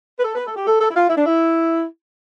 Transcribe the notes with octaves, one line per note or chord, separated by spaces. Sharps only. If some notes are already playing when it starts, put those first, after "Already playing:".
B4
A4
B4
A4
G4
A4
A4
E4
F4
E4
D4
E4